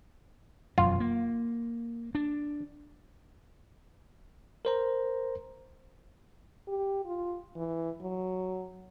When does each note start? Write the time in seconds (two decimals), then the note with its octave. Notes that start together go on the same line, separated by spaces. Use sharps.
0.78 E1 F#2 F#3 F4
1.00 A#3
2.15 D4
4.65 A#4 C5 A#5
6.68 G4
7.05 F4
7.56 E3
8.01 F#3